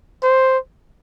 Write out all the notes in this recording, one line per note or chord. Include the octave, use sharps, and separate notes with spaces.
C5